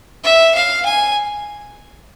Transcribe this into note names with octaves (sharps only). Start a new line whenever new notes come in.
E5
F5
G#5